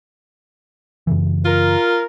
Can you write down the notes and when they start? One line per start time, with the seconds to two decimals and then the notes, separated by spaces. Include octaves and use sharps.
1.07 F#2 C#3 E3
1.45 F4 A#4